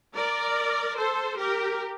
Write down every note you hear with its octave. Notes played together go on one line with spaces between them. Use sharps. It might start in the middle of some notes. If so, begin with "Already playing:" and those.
A#4 D5
A4 C5
G4 A#4